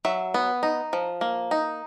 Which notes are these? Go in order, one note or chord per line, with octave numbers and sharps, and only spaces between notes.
F#3 E5
B3
D#4
F3
A#3
D#4